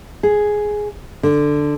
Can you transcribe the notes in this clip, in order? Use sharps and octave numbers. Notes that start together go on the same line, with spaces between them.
G#4
D3